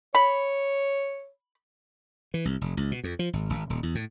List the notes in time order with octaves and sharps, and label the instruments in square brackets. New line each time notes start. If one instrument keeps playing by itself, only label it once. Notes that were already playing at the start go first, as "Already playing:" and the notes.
[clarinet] C#5 [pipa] B5
[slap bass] E3
C2
F1
C#2
B2
F2
F3
G#1
G#1
D#1
E2
A2